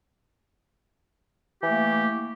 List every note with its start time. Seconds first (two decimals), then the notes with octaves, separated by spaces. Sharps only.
1.60 G4
1.63 E3
1.66 A3
1.69 A#3